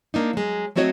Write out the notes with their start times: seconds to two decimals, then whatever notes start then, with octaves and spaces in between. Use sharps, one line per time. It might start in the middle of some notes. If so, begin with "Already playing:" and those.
0.14 A#3 D4 D#4
0.33 F#3 G#3
0.76 F#3 A3 C4 F#4 C#5 D#5